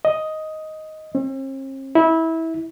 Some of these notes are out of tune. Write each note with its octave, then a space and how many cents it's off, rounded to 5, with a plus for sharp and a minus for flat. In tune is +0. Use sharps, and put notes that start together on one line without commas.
D#5 +5
C4 +45
E4 -20